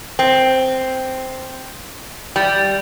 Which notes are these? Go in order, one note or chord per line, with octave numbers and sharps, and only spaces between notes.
C4
G3